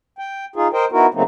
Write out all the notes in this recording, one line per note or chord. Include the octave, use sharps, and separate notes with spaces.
G5
D#4 F4 G#4
A#4 C5 D#5 G5
B3 D#4 E4 F#4 A#4
C#3 F#3 A3 A#3 C4 D#4